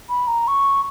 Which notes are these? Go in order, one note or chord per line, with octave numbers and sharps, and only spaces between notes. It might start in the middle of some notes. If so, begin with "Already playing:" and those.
B5
A#5
C#6